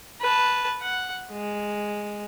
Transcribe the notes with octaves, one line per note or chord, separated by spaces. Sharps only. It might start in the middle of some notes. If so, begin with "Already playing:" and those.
B4 A5
F#5
G#3